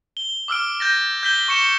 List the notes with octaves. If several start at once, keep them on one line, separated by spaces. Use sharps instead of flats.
G7
D6 E6 F6 D7
G6 A6 A#6
G6 B6 G7
C#6 C#7 E7 G7